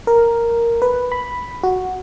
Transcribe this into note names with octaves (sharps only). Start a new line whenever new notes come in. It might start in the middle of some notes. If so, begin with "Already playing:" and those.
A#4
B4
B5
F#4